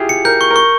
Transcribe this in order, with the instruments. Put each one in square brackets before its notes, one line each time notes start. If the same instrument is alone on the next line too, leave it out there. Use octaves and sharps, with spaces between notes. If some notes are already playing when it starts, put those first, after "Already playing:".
Already playing: [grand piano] E4 F4 G4 G#4
[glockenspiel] C#7
[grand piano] A#4 [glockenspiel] G6
[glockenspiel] C#6
[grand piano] A#4
[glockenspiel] C#6